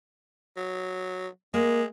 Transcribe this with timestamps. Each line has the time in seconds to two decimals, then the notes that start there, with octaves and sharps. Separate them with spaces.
0.57 F#3
1.54 G#3 A#3